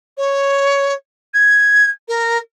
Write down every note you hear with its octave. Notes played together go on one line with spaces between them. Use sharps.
C#5
G#6
A#4